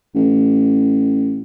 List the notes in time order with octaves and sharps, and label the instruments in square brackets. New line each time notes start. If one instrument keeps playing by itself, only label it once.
[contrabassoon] A1